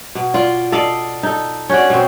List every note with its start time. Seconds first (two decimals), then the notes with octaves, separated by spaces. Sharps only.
0.15 B2
0.34 F4 D5
0.72 A4 D5 D#5 F5
1.23 D#4 A4
1.69 C#4 F#4 D5
1.90 B2 C4